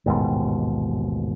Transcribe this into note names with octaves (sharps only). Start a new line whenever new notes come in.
A1 D#2 G#2 B2